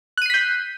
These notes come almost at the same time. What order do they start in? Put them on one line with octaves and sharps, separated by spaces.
F#6 D#7 C7 B6 G6